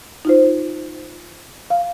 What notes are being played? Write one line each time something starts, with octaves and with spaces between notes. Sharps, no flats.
D#4 F4 C5
F5